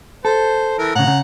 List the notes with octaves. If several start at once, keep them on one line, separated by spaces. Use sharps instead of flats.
A4 C5
E3 A#4
A2 C#3 F#5 A#5
C#3